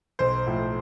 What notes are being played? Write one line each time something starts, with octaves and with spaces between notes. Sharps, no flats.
B1 C5
A2 F3